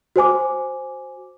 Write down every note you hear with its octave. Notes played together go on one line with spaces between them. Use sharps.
F#4 C5 G#5 D6